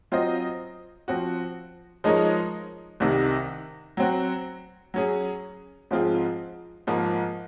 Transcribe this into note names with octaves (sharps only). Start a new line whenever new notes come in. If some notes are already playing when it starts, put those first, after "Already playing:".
F#3 C4 F4 C5 D#5
F3 C4 F#4
F3 G#3 D#4 A#4 C#5
C2 C3 D#3
F#3 C4 F#4
F#3 C#4 G#4
G#2 F3 C4 F4 G#4
G#2 F3 A#3